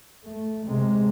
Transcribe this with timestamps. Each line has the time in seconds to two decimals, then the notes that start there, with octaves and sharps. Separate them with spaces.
0.25 A3
0.67 C3 G#3